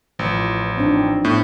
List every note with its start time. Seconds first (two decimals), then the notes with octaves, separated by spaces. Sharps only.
0.19 A1 E3 F3
0.78 C4 D4 D#4
1.25 A2 B3